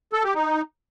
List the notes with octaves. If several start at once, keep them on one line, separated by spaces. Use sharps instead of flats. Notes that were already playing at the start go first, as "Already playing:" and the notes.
A4
G4
D#4